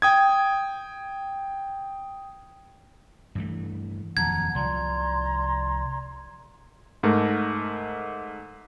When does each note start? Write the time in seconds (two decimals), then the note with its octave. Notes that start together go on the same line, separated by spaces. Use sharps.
0.02 G5 D#6 G#6
3.35 G2 E3 A3
4.17 D#1 F2 F#3 F#5 A5 A#5 G#6
4.55 C2 F3 D5 A#5 C6
7.03 G#2 A3 A#4